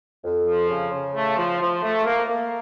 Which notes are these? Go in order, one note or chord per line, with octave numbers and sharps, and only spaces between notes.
F2
F3
C#3
C#3
A3
F3
F3
A3
A#3
A#3